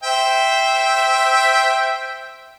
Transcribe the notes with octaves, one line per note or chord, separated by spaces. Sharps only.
C5 E5 G5